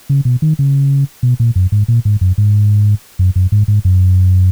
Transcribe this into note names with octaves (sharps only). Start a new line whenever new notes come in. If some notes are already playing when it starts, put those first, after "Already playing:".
C#3
B2
D#3
C#3
B2
A#2
F#2
G#2
A#2
G#2
F#2
G#2
F#2
F#2
G#2
G#2
F#2